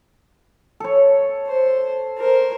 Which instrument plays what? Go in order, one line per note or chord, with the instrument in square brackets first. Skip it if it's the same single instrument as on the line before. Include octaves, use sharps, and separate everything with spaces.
[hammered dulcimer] A4 C#5
[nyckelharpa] C5
A#4 C5